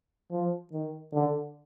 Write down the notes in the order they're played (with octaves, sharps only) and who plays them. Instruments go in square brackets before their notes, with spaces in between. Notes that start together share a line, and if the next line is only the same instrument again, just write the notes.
[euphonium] F3
D#3
D3